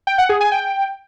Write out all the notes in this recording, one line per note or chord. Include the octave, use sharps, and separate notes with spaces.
G5
F#5
G#4
G#5
G5